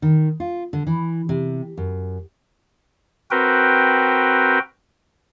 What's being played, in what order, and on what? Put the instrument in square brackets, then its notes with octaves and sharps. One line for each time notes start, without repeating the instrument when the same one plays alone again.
[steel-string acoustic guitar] D#3
F4
D3
E3
C3
F#2
[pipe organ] C4 F#4 A#4 B4 G5